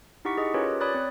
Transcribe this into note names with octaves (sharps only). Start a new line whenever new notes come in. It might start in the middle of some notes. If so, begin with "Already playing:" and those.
D#4 E4 G4 F#5 C#6 B6
G#4 D#5
C#4 F4 G4 A#4 B4 C#5
C#5 D5 B5 D#6 F#6 A6
C4